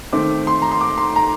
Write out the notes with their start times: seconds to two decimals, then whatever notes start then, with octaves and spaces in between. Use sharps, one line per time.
0.13 D#3 A3 C4 D6
0.47 C6
0.62 A#5
0.71 C6
0.81 D6
0.98 C6
1.16 A#5